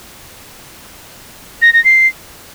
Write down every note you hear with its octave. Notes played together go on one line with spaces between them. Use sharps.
A#6
A#6
C7